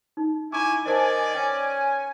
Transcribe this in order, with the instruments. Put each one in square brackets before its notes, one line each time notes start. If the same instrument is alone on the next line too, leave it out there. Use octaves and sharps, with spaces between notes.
[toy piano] D#4
[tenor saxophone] E4 [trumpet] G#5 [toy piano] A#5 C#6 D6
[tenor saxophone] D#3 [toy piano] A#4 C5 A5 [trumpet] D5 [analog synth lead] G#5
[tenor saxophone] C#4 [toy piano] G5